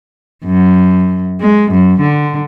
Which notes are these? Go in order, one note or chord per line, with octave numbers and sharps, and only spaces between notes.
F#2
G#3
F#2
D3